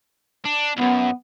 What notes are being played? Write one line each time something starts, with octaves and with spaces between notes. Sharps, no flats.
D4
C2 F#2 B3